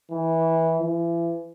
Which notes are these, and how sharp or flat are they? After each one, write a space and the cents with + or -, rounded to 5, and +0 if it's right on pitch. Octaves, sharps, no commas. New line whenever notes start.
E3 -15
E3 +35